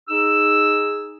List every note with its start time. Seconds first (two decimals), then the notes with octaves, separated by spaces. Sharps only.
0.09 D#4 G#4 E6